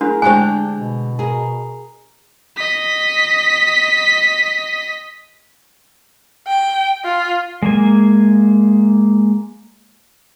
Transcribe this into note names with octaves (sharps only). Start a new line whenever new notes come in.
A3 D4 E4 G#4 A#4
D3 G#3 A3 D4 G4 C5 G#5 C#6
B2
G#4 A#4
D#5 B6
G5
F4
G#3 A#3 G#5